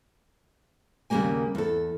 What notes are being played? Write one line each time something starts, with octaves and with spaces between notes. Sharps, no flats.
D#2 C#3 F#3 G3 A#3 G#5
E2 A4